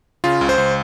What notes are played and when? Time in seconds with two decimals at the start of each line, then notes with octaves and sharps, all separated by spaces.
0.24 C#3 F4
0.41 C#2
0.49 C5
0.58 C#2